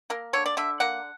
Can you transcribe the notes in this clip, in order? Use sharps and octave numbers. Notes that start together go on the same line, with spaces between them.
A#3 A#4
D3 C#5
D5
D3 E5
A#3 F#5